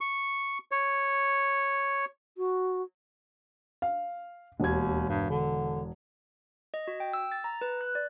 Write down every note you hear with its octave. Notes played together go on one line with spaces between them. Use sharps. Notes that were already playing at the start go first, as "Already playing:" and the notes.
C#6
C#5
F#4
F5
E1 D#2 G#6
G2
D3
D#5
F#4
G5
E6
A6
A#5
B4
F#6
D5